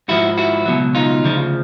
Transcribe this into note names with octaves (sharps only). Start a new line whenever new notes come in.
G#2 F3 E4 F#4
E4 F#4
C#2 B2 F#3
D#4 F4
D2 C#3 F3